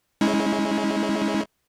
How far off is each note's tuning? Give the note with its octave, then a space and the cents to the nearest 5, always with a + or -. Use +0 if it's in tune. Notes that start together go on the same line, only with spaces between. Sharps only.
G#3 +0 C#4 +0 E4 -35